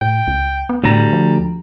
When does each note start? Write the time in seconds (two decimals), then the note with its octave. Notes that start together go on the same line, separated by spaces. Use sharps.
0.01 A2 G5
0.27 C#2
0.69 B3
0.84 D2 A2 G3 A#5
1.13 F3